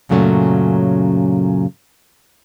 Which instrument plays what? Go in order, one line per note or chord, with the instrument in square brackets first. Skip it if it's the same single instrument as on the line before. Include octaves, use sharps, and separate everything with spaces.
[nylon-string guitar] F#2 A#2 C#3 F#3 A3 C#4